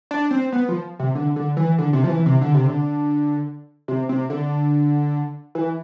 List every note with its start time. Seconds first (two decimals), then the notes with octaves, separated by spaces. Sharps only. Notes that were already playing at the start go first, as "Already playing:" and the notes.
0.11 D4
0.31 C4
0.52 B3
0.68 F3
0.99 C3
1.15 D3
1.36 D3
1.57 E3
1.78 D3
1.93 C3
2.04 F3
2.09 E3
2.26 C3
2.41 D3
2.54 C3
2.67 D3
3.88 C3
4.09 C3
4.30 D3
5.55 E3